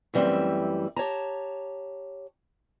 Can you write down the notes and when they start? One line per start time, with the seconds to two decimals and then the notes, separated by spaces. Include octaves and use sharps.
0.14 F#2 E3 G3 A3 C4 E5
0.96 G4 C#5 A5 A#5